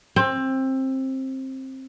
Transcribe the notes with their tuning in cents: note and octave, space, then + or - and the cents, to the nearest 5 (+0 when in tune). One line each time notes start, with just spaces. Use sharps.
C4 +20